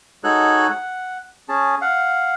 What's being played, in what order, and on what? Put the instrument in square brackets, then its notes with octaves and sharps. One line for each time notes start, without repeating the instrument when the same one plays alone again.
[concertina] G#3 D#4 F#4 A4 C#5 F#6
F#5
C#4 G#4 A5
F5 F#5